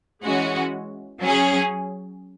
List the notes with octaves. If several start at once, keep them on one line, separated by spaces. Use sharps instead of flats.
E3 G#3 C#4 F#4
F#3 C#4 G#4